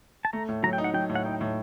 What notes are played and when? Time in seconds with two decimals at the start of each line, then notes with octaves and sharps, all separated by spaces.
0.25 A5
0.33 A3 A#5
0.48 A2
0.63 F#3 A#5
0.73 G5
0.78 D#4
0.84 F#5
0.93 F#3 G5
1.09 A2
1.15 F#5
1.25 D#4 G5
1.41 A2